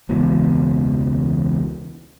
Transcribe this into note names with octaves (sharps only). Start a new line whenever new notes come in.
E1 C#2 B2 E3